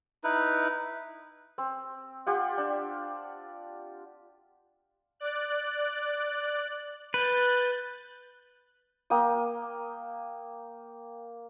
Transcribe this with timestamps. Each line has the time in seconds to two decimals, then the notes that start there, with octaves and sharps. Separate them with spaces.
0.24 D#4 E4 B4
1.58 C4
2.27 F4 G4 F#5
2.58 D4
5.20 D5 F#6
7.14 B4 G6 A6
9.10 A#3 G5 D#6